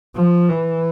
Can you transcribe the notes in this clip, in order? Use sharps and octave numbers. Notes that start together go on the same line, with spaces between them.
F3
E3